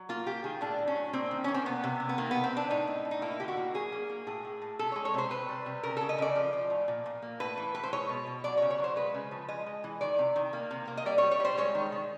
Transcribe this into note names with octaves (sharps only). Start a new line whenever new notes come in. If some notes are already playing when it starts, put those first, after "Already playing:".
Already playing: F#3
A#3 F4
A#3 G4
D#3 G#4
A2 D4
A2
C#4
F#3
A#3 C4
D#3
A#3 C#4
C4
C3 B3
C3
A#3
B3
D#3 A#3
C3 B3
C4
C3 D4
A2 D#4
A2
A2
D#4
A#3 E4
D3 G4
F#4
A#3
F#3 G#4
A#3
A#3
A2 G#4
A2
A2
C3 A4
G#3 C#5
C#5
C3 C5
C3 B4
G3
C3
C#3 A#4
C#3 A4
D#5
C#3 D5
F3
F3
A2
A#2
A#2
A#3
A2 B4
E3
A2 B4
C5
G#3 C#5
B2
B2
F#3 D5
C#5
C#3
C#5
F#3 C5
G#3 B4
C#3
F3
G#3 D#5
G#3
E3
D#3 D5
C3
D#3
A#3
C3
A#3
D#5
G3 D5
C#5
G3
C#5
G3 C5
G#3 C#5
D#3
D#3